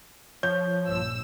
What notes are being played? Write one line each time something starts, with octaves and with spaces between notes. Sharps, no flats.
F3 C#5 G6
A#1 G2 E6